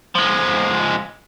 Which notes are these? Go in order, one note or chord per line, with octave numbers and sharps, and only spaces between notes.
F3 G#3